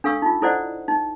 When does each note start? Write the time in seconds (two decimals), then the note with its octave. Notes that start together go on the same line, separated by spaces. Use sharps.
0.04 D4 A4 F5 C#6 E6
0.22 D#4 F4
0.42 E4 A4 C5 D5 D#5 F#5
0.88 D#4